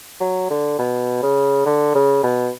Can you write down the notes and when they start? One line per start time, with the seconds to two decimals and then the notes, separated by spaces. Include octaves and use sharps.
0.20 F#3
0.50 D3
0.79 B2
1.23 C#3
1.65 D3
1.95 C#3
2.23 B2